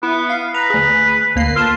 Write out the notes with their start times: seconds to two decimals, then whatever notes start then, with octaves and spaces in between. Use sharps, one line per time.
0.03 B3 E4
0.30 F5
0.55 B4 A#5
0.70 D2 G#4
1.36 D2 A#3 C7
1.56 F4 A4 A5